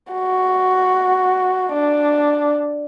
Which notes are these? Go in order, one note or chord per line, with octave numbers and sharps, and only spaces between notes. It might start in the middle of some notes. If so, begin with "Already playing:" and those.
F#4
D4